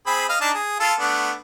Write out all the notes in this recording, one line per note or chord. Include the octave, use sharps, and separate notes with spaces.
C4 G#4 B5
D#5 F5
D4 D#4 A5
G#4
F4 A4
A3 B3 D4